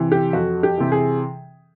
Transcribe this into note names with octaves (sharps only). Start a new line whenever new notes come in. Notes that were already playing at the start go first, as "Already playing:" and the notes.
Already playing: C3 E3
G4
F2 F#4
G4
C3 E3
G#4